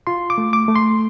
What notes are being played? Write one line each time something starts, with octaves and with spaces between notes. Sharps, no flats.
F4 C6
D6
A3
D6
A3
C6